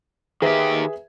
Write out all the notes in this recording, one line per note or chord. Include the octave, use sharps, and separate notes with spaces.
D#3 G4 G#4 B4 E5